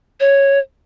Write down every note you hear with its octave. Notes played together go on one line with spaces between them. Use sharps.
C#5